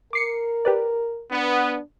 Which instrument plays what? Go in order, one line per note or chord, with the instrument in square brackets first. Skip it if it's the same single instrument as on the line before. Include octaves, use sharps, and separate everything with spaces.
[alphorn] A#4 [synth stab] D6 C7 C#7
[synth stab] G4 B4 D5
[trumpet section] B3 [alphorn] D4